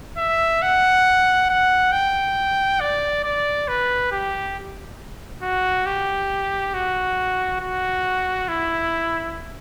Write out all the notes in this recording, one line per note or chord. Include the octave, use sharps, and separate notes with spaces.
E5
F#5
F#5
G5
D5
D5
B4
G4
F#4
G4
F#4
F#4
E4